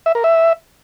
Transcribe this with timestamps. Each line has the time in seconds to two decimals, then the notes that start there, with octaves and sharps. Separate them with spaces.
0.06 E5
0.15 A#4
0.24 E5